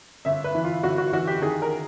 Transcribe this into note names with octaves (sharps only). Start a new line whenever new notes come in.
G1 E5
B4
E3
F4
G1 F#4
F#4
E3 F#4
G4
D#3 G#4
A#4